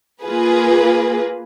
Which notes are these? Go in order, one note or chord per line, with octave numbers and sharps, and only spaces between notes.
A#3 F4 G#4 B4